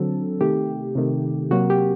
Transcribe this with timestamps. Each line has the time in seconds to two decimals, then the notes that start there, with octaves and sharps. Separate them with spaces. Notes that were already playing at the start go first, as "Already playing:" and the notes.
Already playing: D3 F#3 C4 A4
0.41 C3 D#3 A3 G4
0.95 C3 D#3 A3
1.51 C3 F#3 A#3 F#4
1.70 G4